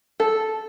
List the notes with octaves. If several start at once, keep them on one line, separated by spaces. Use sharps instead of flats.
A4